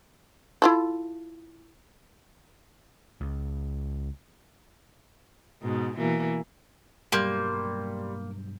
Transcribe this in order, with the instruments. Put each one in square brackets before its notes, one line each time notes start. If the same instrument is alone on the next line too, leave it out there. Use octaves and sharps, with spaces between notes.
[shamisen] E4 F4 A4
[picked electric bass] C#2
[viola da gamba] G#2 B2
B2 E3 A#3
[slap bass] G2 B2 F#3 [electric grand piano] G3 C6 G6 [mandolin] A#3